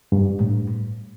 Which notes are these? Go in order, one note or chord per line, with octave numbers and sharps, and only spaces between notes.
G2
A2